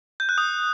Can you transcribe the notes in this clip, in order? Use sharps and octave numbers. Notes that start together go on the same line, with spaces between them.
G6
F#6
D#6